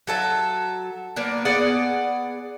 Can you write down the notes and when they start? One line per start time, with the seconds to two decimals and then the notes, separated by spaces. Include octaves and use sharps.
0.07 F#3 A4 E5
1.16 A#3 B3 D4
1.45 B3 G#4 D5 F#5